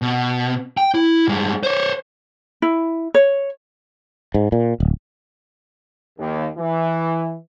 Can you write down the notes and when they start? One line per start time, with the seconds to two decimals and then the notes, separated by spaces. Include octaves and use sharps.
0.02 B2
0.78 G5
0.95 E4
1.28 G2 G#3
1.63 C5 C#5
2.62 E4
3.14 C#5
4.34 G#2
4.52 A#2
4.80 D1
6.19 D#2
6.57 E3